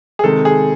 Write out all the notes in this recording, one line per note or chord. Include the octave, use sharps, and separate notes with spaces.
G#4
C3 D#3 G#3 A4
G#4